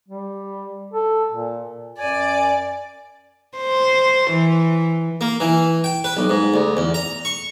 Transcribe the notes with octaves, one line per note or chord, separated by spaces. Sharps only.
G3
A4
A#2
F#2 D5 G#5
C5
E3
A#3
E3
G5
B4
B1
G#2
D2
E2
A#5
C#6